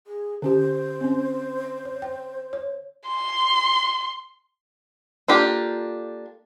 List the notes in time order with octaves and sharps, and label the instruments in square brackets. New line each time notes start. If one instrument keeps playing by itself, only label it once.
[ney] G#4
[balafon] D3 C#4 G4 [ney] C5
[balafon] C4 C#4
C#5
G5
C#5
[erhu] C6
[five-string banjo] A#3 D4 F4 G4 A4